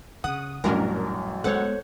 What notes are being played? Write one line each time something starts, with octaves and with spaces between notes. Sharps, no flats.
C#3 F#5 D#6
A1 F#2 A#2 G3 C#4 D4 A#4
G#3 B3 A4 C5 C#5 F#5